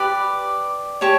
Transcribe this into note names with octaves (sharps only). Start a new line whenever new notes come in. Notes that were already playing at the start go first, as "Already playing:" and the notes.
Already playing: G4 B4 D5 B5 D6
G4 C#5 A5 C#6